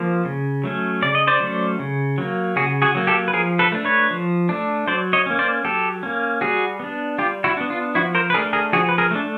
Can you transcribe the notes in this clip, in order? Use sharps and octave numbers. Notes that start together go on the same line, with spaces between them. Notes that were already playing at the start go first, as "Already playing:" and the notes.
Already playing: F3 A#3
C#3
F#3 A3 C#4
C#3 D5
D#5
C5 D5
F#3 A3 C#4
C#3
F#3 A#3
C#3 F#4 G#4
F#4 G#4
F#3 A#3
G4 A4
B4
F3 G#4 A#4
A4 B4
A3 D4
B4 C#5
F3
A3 D4
F#3 C5 D5
C#5 D#5
A#3 C#4
C5 D5
F#3 G4 A4
A#3 C#4
G3 F#4 G#4
B3 D4
G3 F4 G4
E4 F#4
B3 D4
F4
F3 E4 F#4
A#4 C5
B4
A3 D4 G#4 A#4
G#4 A#4
F3 F#4 G#4
B4
G#4 A#4
A3 D4